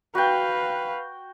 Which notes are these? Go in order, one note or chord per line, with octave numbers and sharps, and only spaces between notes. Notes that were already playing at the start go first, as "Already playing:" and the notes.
F#4 B4 F5 G5